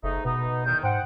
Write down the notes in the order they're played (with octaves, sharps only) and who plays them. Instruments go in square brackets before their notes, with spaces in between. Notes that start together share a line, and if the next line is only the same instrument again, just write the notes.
[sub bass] F#1 [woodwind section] G#2 A3 D#4
[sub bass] B2 [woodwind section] B3 D#4
[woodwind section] E2 D#3 [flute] G6
[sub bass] G#2 [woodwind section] C5 F#5 [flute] G5